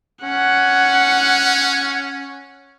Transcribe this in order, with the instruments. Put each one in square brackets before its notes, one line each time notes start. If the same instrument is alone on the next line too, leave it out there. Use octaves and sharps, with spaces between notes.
[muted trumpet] C#4 [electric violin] F#5